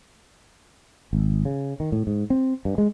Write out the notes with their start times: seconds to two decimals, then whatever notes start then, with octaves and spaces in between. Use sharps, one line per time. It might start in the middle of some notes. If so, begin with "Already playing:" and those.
1.13 G#1
1.45 C#3
1.80 D#3
1.92 A2
2.07 G#2
2.30 C4
2.65 G2
2.78 G#3